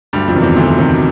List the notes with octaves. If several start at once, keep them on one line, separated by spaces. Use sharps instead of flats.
D2 G2 G3
F2 F3
C3 D#3 F#3
E2 E3
D2 D3
C3 D#3 F#3